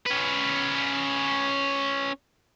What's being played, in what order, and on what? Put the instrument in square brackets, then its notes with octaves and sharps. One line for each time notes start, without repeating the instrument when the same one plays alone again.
[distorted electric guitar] C#4 B4